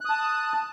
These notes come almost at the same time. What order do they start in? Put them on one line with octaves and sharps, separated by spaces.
F#6 D#6 A5